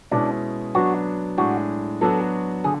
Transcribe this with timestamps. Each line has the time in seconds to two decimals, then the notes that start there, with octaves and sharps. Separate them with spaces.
0.11 B2 G#3 C#4 D4 E4
0.75 F#3 B3 D4 F#4
1.37 A2 G#3 D4 F#4
2.01 F#3 B3 D4 F#4 A4
2.64 D3 G#4